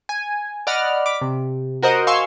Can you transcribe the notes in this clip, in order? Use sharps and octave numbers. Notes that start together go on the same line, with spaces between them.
G#5
D5 D#5 F#5 B5 F6
B5 D6
C3
F#4 A#4 C5 D#5 F#5
F5 G#5 C6 C#6 E6